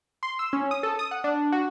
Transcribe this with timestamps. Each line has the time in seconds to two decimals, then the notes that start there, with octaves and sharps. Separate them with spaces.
0.23 C6
0.39 E6
0.53 C#4
0.71 D#6
0.83 A4
0.99 D#6
1.11 F#5
1.24 D4
1.52 F#4